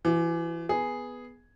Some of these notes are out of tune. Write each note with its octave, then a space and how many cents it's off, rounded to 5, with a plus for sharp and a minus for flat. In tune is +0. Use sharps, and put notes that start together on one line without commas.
E3 +30 F#4 +0
B3 +0 G#4 +0